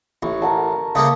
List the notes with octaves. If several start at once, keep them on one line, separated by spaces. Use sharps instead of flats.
A1 C#6
A#4 F#5 A5
C#3 A3 A#3 A5 D#6